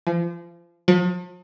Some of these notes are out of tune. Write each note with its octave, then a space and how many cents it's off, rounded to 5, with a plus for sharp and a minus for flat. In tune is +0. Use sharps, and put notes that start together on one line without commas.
F3 -30
F3 +45